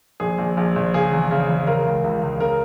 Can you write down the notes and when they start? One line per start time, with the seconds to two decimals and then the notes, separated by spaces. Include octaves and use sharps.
0.20 A#1 G#4
0.38 A#1
0.57 A#1
0.76 A#1
0.94 C#3 G#4
1.12 E2
1.31 C#3
1.49 E2
1.67 C#3 A#4
1.86 C#2
2.04 C#2
2.23 C#2
2.40 C#3 A#4